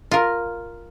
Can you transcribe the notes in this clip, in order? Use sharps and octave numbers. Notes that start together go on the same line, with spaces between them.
F4 A#4